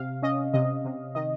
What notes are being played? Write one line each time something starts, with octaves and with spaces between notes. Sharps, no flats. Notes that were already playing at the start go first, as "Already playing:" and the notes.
Already playing: C3 F5
C#4 D#5
C3 D#5
C3
D#3 D#5